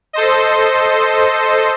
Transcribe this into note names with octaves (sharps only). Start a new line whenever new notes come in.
A4 C5 D#5